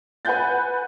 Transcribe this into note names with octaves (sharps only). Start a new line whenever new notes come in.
B4 F#5 G#5 F#6 G6 A6